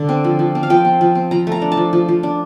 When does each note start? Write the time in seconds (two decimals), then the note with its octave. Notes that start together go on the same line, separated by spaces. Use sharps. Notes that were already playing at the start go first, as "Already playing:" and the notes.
Already playing: D3
0.09 C4
0.24 F3
0.39 F3
0.55 C4
0.63 F5
0.70 F3 G5
0.85 C4
1.01 F3
1.15 C4
1.31 F3 A#5
1.47 A3 A#5
1.62 D4
1.72 A5
1.77 F3
1.93 F3
2.08 F3
2.23 D4